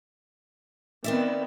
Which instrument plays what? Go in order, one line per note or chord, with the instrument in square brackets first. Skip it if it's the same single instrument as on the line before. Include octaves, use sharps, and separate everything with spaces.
[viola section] D#3 B3 [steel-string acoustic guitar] C4 D5 E5